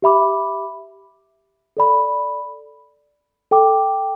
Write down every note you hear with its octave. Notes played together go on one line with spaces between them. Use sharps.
G4 E5 B5 D6
A4 D5 B5
A4 G5 D6